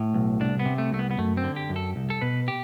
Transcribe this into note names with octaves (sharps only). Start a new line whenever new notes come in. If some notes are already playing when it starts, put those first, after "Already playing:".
Already playing: A2
B1
C2 D4
B3
C3
A3
C2 A3
B3
B3
F#2 A3
C4
D3
G4
F#2
A4
C2
A4
B2 B4
G4